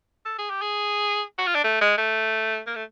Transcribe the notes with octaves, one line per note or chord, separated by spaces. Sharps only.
A4
G#4
G4
G#4
F#4
F4
D4
A3
G#3
A3
A#3
A3